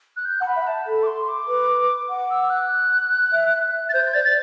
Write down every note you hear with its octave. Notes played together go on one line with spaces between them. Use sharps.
F#6
G6
F#5 A5
B5
E5
A5
A4 B5
D6
C6
D6
B4
F#5 D6
E6
F#6
E5
A6
C5 G6
D5 A6
A6